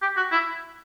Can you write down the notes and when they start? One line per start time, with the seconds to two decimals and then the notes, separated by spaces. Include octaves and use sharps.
0.02 G4
0.16 F#4
0.32 E4